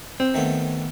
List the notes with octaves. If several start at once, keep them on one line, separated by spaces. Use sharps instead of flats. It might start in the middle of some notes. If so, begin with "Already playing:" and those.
C4
D#3 A3 B3